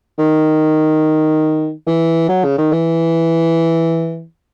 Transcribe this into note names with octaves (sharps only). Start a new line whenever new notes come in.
D#3
E3
F#3
C#3
D#3
E3